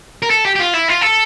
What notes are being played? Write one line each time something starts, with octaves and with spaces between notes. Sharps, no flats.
A#4
A4
G4
G4
F4
E4
F4
A4